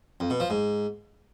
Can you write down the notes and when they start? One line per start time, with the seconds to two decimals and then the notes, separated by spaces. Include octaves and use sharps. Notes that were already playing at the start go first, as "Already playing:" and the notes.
0.20 F2
0.30 B2
0.40 F3
0.50 G#2